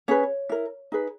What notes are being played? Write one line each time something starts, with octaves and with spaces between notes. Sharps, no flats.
C#4 G#4 B4 C#5
E4 A#4
D#4 G#4 B4